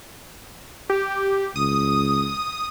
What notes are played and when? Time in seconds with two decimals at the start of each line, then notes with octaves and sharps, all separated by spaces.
0.90 G4
1.56 C#2 D#6